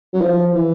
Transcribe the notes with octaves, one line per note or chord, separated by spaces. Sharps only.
F#3
F3
E3